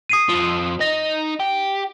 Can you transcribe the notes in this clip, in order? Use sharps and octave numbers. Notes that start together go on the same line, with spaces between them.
D#6 C7 D#7
F2 F3
D#4 A#6
G4